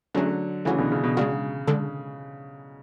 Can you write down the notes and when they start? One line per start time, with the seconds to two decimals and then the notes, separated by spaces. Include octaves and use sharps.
0.15 D3 F#3 A3 C#4 G#4
0.65 C#3 E3 A3 C#4 F#4
0.78 B2 D3
0.92 C#3
1.04 B2
1.17 C#3 G#3 D4 F#4
1.67 D3 G#3 D4 A4